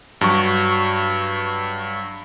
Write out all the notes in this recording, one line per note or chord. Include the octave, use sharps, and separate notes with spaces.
G2 F#3 C#6